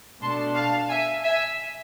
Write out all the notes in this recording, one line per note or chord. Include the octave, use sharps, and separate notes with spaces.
B2 A3 D4 A5 C6
F5 A5
E5 G#5
E5 G#5